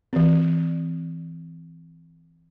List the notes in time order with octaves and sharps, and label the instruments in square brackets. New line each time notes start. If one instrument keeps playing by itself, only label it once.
[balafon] E3 C4